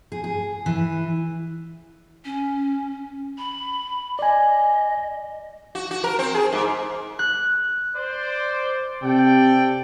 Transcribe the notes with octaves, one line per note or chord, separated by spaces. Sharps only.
G#4
G#4
E3
C#4
B5
D5 D#5 G#5
F#4
F#4
A#4
C4
G#4
G#2
F#6
C5 D5
C3 A4 D5 G5